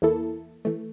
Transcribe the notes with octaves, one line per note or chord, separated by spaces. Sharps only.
E2 E3 A#3 E4 A4
E3 A3